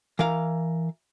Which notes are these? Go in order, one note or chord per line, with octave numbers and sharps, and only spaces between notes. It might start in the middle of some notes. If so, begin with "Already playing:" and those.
E3 A#4 F5